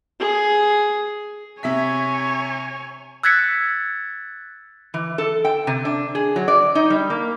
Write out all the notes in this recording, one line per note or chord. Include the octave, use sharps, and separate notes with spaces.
G#4
C3 C#5 E5 G#5 B6
E6 F#6 G#6 A6 B6 C#7
E3
A4
G5
C3
D4
G#4
F#3
D5
D#4
G3
A#3